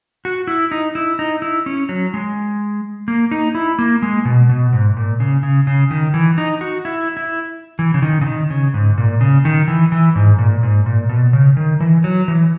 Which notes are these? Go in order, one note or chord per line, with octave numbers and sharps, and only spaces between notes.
F#4
E4
D#4
E4
D#4
E4
C#4
F#3
G#3
A#3
D#4
E4
A#3
G#3
B2
B2
G#2
A#2
C#3
C#3
C#3
D#3
E3
D#4
F#4
E4
E4
E3
C#3
D#3
C#3
D#3
C#3
G#2
A#2
C#3
D#3
E3
E3
G#2
A#2
G#2
A#2
B2
C#3
D#3
E3
F#3
E3